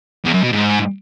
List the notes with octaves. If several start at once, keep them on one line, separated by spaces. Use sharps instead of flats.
E2
F#2
B2
G#2